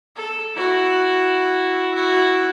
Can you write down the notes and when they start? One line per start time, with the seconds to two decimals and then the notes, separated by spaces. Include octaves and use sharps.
0.16 A4
0.56 E4 F#4
1.94 E4 F#4